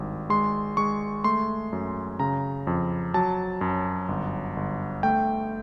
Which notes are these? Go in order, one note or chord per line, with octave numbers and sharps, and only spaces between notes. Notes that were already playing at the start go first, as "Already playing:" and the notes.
Already playing: G#1 G2
G#3 C6
G#3 C#6
A3 C6
F#2
C#3 A#5
F2
F#3 A5
F#2
G1
G1
A3 G5